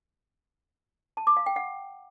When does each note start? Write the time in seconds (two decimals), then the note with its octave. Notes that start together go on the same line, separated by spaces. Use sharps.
1.17 A5
1.27 D6
1.37 F5
1.46 G5
1.56 F#5